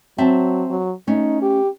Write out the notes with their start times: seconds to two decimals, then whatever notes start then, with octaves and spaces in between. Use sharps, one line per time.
0.18 F#3 C4 E5 A5
0.70 F#3
1.07 A3 C#4 D#4
1.42 G4